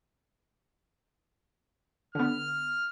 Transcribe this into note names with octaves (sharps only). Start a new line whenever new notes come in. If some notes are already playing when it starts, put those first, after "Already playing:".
D3 B3 F6